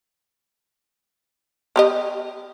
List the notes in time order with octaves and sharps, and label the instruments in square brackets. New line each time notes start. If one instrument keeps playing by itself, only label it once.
[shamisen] B3 G4 D#5